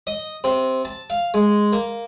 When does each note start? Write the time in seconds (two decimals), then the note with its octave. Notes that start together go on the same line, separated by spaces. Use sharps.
0.07 D#5
0.44 C3
0.85 A5
1.10 F5
1.34 G#3
1.72 A#3